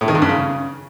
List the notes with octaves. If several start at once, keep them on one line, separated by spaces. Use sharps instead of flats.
A2
D#3
G2
F#2
C#3